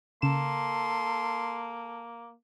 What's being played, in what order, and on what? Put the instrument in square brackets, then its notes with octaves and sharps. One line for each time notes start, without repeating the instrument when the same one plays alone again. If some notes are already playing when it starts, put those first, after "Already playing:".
[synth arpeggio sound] C#3 E7 [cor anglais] A#3 [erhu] A4 [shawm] C6